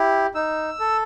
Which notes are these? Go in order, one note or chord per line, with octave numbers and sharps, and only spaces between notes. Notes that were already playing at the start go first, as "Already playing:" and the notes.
Already playing: E4 G4
D#4 E6
A4